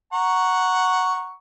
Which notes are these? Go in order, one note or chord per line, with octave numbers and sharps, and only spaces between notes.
F#5 A#5 C#6